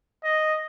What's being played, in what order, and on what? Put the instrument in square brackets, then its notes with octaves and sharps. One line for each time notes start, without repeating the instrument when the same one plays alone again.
[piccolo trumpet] D#5